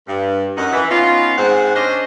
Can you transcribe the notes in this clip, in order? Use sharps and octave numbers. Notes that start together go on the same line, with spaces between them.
G2
F#2 D#4 F#5
E3
B3 C#4 D#4 F4
G#2 C4 F#5
C#4 D4 G4 C5 C#5 D#5